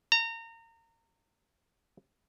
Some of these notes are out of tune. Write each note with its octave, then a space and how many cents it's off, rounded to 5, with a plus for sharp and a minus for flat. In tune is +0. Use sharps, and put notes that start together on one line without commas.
A#5 -30